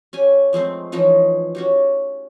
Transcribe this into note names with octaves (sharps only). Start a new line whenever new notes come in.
C#4 G4 G#5
F3 G#3 A3 C4
E3 F3 C#4 D#4
C#4 F#4 G4